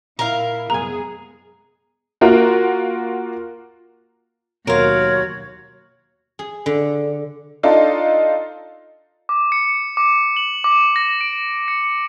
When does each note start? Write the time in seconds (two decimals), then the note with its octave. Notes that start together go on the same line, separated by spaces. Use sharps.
0.19 A#2 E4 A#4 F5
0.70 C2 F#2 G#3 B3 G#4 G#5 A#5
2.21 A#3 F4 F#4 A#4
4.67 D#2 B2 F#3 F#4 A#4 C#5 F5 C6
6.39 G#4
6.66 D3
7.63 D4 D#4 F4 A4
9.29 D6
9.52 C#7
9.97 D6
10.37 F#7
10.64 D6
10.96 A#6
11.21 D7
11.68 C#7